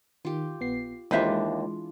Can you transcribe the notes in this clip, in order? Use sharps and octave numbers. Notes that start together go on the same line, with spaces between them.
D#3 F4 G4
A#1 B3 C7
D#2 E3 G#3 D4 F4 B4 C5 E5